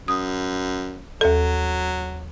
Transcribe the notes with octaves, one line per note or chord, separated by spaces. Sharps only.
F#2 D#6
D#2 F#3 A4